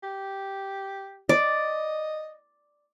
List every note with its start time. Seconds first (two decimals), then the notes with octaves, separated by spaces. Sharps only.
0.03 G4
1.29 D5 D#5